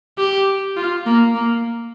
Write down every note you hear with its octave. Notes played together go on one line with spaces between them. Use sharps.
G4
F4
A#3
A#3